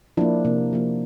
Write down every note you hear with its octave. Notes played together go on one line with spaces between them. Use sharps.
F3 A#3 D4 E4
C3 A#3
F3 A#3